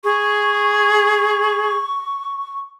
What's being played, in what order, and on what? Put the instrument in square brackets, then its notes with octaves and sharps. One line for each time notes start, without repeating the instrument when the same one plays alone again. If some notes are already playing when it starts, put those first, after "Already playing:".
[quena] G#4 [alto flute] C#6